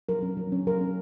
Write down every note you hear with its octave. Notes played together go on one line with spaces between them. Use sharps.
F#3 A#4
C#4
F#3
C#4
F#3 A#4
C#4